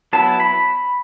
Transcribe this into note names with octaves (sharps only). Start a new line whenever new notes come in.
F#3 B3 E4 A5
B5